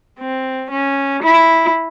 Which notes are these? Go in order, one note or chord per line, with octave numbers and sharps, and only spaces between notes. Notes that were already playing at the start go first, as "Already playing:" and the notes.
C4
C#4
E4